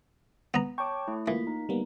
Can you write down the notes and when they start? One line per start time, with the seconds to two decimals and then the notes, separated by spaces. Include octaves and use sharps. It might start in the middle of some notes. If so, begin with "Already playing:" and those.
0.54 B3 A#5
0.78 C#5 G5 A5 C#6 D6
1.08 A3 E4
1.28 E3 A#3 F4 B6
1.47 D#4
1.69 G3 A#3 B3